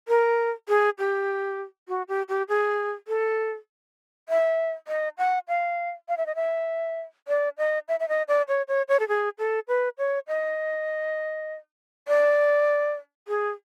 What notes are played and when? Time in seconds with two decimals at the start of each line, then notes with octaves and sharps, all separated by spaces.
0.08 A#4
0.68 G#4
0.99 G4
1.88 F#4
2.08 G4
2.29 G4
2.49 G#4
3.08 A4
4.29 E5
4.88 D#5
5.18 F#5
5.48 F5
6.08 F5
6.17 E5
6.26 D#5
6.35 E5
7.28 D5
7.58 D#5
7.88 E5
8.00 E5
8.09 D#5
8.28 D5
8.48 C#5
8.68 C#5
8.88 C#5
9.00 A4
9.08 G#4
9.39 A4
9.68 B4
9.98 C#5
10.28 D#5
12.08 D5
13.28 G#4